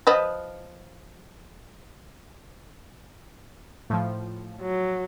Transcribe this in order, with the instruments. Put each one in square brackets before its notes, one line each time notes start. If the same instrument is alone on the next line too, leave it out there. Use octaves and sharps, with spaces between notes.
[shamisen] F3 B4 D#5
[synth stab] A2 F3
[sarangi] F#3